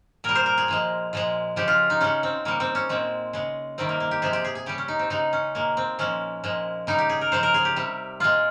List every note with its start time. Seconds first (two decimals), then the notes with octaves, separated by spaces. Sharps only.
0.24 A#2 G3 A#4
0.35 C5
0.46 A#4
0.58 G#4
0.68 A#2 F3 G#3
1.13 A#2 F3 G#3
1.56 C#3 F3 G#3 G4
1.68 F4
1.90 D#4
2.01 C#3 G#3 C#4
2.23 C4
2.45 C#3 G3 A#3
2.60 C4
2.75 C#4
2.89 A#2 G#3 C4
3.33 C#3 G#3
3.78 C3 D#3 G3 C4
3.89 A#3
4.00 A#3
4.11 G4
4.22 C3 F3 G#3 G#4
4.33 G4
4.44 G#4
4.55 G#4
4.66 C#3 G3 G4
4.78 C#4
4.88 D#4
4.99 C4
5.10 C#3 G#3 D#4
5.33 C#4
5.55 A#2 G#3 A#3
5.77 C4
5.99 A#2 F3 G#3 C#4
6.43 A#2 F3 G#3
6.87 C#3 G3 D#4
6.99 G4
7.09 G#4
7.21 A#4
7.32 C#3 F3 G#3 C5
7.43 A#4
7.54 G#4
7.65 G4
7.76 C3 G3
8.20 A#2 G#3 F4